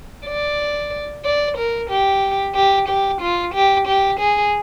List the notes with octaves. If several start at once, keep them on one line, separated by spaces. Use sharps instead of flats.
D5
D5
A#4
G4
G4
G4
F4
G4
G4
G#4